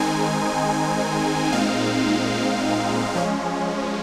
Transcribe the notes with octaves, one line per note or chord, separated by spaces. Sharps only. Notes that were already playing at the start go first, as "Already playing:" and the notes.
Already playing: D#3 G#3 C4 D#4 G#5
A#2 G#3 C4 D#4 F5
F3 G#3 C#4